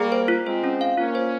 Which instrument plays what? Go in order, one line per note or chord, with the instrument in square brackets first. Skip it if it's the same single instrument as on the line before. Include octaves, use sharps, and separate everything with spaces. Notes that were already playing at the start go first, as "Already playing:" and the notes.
Already playing: [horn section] G3 A#3 [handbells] G#4
[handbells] C5
F4
[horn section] G#3 C4 [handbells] C5
[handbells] C#4
F5
[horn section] A#3 C#4 [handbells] F4
[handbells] C5